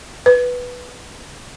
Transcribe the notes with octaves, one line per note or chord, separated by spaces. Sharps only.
B4